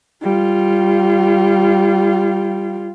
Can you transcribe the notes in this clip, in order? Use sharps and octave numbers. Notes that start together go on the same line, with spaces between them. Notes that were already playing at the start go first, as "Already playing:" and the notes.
G3 F4